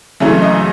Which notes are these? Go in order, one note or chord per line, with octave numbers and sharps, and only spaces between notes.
F#1 F#2 C#3 E3 A3 E5
D#5